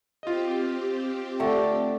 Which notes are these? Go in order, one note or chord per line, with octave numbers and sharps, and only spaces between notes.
C4 F4 G4 D#5
D3 A3 D4 F#5 G5 A5